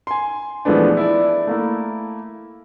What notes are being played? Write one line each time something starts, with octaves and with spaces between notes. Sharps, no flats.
G#5 C6
E3 F3 G#3 A3 B3 D4
E4 D5
A3 A#3 E4